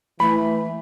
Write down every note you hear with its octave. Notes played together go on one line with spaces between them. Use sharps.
E3 A3 B5